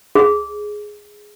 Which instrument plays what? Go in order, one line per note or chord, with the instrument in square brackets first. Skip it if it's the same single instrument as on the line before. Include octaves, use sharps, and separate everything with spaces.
[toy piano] G#4